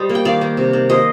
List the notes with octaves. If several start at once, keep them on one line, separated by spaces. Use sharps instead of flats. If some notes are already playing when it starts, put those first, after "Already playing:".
Already playing: G3 C5 D#5
A#3
G5
D#3 D5 F5
A#3
C3
D#3
A#3 C5 D#5